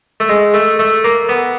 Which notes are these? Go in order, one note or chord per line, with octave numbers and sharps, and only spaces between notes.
A3
G#3
A3
A3
A#3
B3